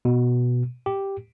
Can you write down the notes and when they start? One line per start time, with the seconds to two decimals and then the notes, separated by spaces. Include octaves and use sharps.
0.05 B2
0.86 G4